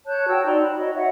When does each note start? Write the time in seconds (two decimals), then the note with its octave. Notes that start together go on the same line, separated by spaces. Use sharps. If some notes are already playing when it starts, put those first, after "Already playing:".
0.07 C#5 A5 F#6 G6
0.28 F#4 G5 A5 E6
0.46 D#4 D5 A#5 C6
0.62 B5
0.77 F#4 C#5 D#5
0.95 D#5 E5 F#5